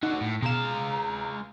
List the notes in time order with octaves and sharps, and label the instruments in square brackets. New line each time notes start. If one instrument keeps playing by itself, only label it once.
[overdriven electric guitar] D3 F#4 [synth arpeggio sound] D#4
[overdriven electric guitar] A2
[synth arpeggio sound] B2 E7 [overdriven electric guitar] G#3 F5 [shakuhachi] A#5